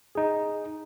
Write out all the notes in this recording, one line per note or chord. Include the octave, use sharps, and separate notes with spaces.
D#4 G#4